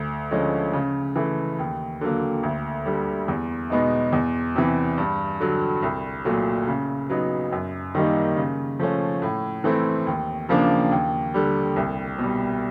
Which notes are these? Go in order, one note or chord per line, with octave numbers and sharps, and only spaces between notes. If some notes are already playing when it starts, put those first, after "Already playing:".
Already playing: D2
D3 F3 G#3 C#4
C#3
E3 A3
D#2
D3 F#3 A#3
D2
D3 G3
E2
B2 G#3 B3 D#4
E2
C3 E3
G2
D3 F#3
C2
A#2 F#3 A3
C#3
F#3 B3 D#4
F#2
D#3 G3 A#3 D#4
C#3
F3 A3 C#4
A2
E3 A3 C4
D#2
C#3 F3 A#3 D4
D#2
D3 G3
C2
B2 G3